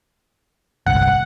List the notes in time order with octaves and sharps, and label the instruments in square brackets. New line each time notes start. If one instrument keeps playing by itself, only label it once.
[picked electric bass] G1 C2 [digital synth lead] F#5